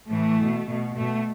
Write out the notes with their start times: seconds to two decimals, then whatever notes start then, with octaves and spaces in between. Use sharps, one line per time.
0.09 A2 E3 A3
0.38 B2
0.67 B2
0.96 B2 A3